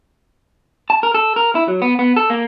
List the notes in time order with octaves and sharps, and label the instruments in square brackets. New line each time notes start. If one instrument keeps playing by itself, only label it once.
[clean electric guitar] A5
A#4
A4
A#4
E4
F#3
B3
B3
A4
A#3